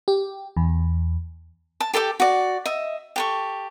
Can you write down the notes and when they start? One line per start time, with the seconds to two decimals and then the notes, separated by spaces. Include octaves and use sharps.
0.08 G4
0.57 E2
1.80 A5
1.93 G4 A4 G5 D6
2.20 F#4 D5
2.66 D#5 E5
3.16 G4 A4 C#6